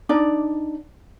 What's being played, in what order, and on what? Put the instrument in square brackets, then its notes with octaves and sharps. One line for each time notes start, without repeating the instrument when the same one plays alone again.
[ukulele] D4 D#4 D5